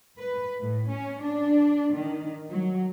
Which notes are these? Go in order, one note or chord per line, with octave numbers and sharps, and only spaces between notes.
B4
A2
C#4
D4
D#3
F#3